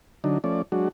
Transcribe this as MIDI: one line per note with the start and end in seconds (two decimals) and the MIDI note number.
0.24 0.38 50
0.24 0.38 54
0.24 0.38 62
0.24 0.38 63
0.44 0.62 53
0.44 0.62 57
0.44 0.62 61
0.44 0.62 74
0.72 0.88 54
0.72 0.88 56
0.72 0.88 62
0.72 0.88 66